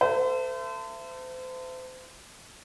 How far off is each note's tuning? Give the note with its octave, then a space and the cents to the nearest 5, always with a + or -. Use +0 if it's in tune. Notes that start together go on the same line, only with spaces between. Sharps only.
A4 +30 C5 -35 E5 +30